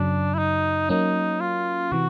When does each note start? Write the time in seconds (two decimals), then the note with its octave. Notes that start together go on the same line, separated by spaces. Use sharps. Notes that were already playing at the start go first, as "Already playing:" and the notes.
Already playing: F#2 C#3 F#3 D4
0.34 E4
0.39 D#4
0.89 F#3 A#3 C#4 D#4
1.40 F4
1.92 C3 E3 F#4